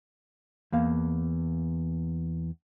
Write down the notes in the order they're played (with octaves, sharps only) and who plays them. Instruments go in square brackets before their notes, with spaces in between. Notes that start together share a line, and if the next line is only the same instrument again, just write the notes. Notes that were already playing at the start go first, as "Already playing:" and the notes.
[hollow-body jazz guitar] E2 A#3 F5